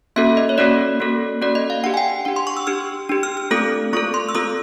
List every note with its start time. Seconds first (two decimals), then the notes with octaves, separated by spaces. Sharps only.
0.16 A#3 C#4 F#4 A4 E5
0.37 D#5
0.49 C#5
0.58 A#3 C#4 F#4 A4 D5
1.00 A#3 C#4 F#4 A4
1.41 A#3 C#4 F#4 A4 D5
1.55 D#5
1.70 F5
1.84 D4 G4 F#5
1.94 G#5
1.97 G5
2.25 D4 G4 F#5
2.36 C6
2.47 C#6
2.57 E6
2.67 D4 G4 F6
3.09 D4 G4
3.23 F6
3.37 F6
3.51 A3 C4 F4 A4 D#6
3.93 A3 C4 F4 A4 C#6
4.14 C6
4.29 E6
4.34 A3 C4 F4 A4 D#6